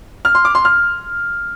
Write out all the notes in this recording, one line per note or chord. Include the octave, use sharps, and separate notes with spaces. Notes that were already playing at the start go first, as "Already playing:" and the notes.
F6
C6
D6
C6
F6